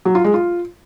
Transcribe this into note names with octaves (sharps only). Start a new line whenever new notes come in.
F#3
F4
G#3
F4